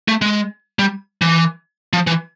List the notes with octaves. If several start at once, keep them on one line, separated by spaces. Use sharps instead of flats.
A3
G#3
G3
E3
F3
E3